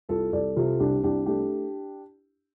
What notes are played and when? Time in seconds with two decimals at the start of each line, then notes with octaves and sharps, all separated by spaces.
0.09 C2 F4 A4
0.32 C2 A4 D5
0.56 C3 F4 A4
0.80 C2 D4 G4
1.03 C2 D4 G4
1.26 A3 D4 G4